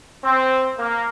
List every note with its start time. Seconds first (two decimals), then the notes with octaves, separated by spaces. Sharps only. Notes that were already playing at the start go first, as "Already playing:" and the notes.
0.24 C4
0.78 A#3